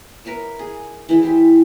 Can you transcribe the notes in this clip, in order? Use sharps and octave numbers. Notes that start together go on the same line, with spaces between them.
A#4 B4 C#5 E5
G#4
E3 E4 G#4
G4 C5 E5